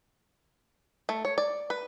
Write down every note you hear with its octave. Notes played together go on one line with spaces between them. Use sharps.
A3
C#5
D5
B4